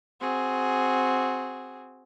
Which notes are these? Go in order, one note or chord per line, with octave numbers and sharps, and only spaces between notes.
C4 F#4 G#4